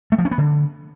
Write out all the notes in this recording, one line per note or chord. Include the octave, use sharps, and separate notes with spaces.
A3
F3
C#4
B3
D3